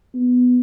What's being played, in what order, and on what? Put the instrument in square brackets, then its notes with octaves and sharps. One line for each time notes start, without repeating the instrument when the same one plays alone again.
[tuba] B3